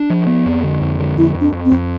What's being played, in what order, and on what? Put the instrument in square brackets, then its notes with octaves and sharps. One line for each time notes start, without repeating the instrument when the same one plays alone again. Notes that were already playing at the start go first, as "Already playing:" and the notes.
Already playing: [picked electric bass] D4
F3
B3
F2
D3
F2
D3
[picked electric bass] F2 [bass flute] E4
[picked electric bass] F2
[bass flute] D4
[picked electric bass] F2
[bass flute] C4
[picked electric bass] F2